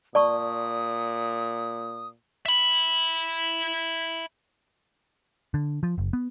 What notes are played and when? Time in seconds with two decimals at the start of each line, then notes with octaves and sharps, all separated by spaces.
0.15 A#2 D5 A5 C#6 D#6
2.46 E5 B5
5.54 D3
5.83 F3
5.98 F#1
6.13 B3